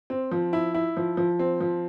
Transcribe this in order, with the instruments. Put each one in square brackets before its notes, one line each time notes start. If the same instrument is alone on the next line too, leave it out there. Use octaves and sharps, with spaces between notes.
[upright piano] C4
F3
E4
E4
F3
F3
C4
F3